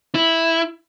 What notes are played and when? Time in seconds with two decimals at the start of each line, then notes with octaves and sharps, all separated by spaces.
0.15 E4